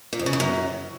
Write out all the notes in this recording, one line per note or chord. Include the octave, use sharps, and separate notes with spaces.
A#2
F2
C#3
E2
F#2